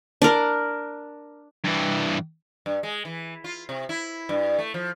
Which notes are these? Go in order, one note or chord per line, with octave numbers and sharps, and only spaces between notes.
D4 A#4
G2 E3
G2
G#3
E3
F4
C3
E4
G2
A3
F3